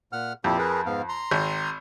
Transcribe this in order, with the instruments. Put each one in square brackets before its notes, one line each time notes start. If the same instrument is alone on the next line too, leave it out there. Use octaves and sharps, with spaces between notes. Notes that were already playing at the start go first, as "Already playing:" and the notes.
[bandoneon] A#2 F#5 F6
[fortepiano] F2 [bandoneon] A#2 E4 G4
[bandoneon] G#4 A#4 B4
G#2 B3 F5
A#5 C6
[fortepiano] G#1